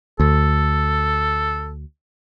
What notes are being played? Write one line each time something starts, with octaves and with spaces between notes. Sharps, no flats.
D2 A4